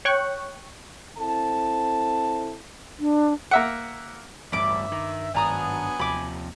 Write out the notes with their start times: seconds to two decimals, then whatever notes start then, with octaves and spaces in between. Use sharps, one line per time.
0.05 C#5 G5 C#6 F#6
1.18 C4 E4 A4 A5
2.99 D4
3.51 A#3 E5 F#5
4.52 A1 D2 G2 G3 E5 B5 D6
4.92 D#3
5.34 G#1 F#3 B3 D4 G#5 A#5 D#6
5.99 D#2 C3 F3 B5 D6